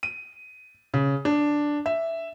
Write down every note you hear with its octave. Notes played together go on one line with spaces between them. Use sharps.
D#7
C#3
D4
E5